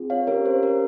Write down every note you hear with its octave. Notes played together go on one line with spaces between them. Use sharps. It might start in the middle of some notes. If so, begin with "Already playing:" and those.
Already playing: C4 F4 G#4
C#5 F5
C#4 G4 A#4 C#5
C5
A#4